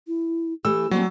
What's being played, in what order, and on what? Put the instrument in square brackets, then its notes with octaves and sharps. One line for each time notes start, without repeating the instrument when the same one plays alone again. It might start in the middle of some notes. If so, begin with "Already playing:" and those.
[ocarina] E4
[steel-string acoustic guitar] E3 A3 [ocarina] G4 [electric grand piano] E6
[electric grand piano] F#3 [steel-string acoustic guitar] G3 C4 C#4 [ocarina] A#3